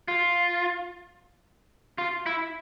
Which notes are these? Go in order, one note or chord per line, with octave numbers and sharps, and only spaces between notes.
F4
F4
E4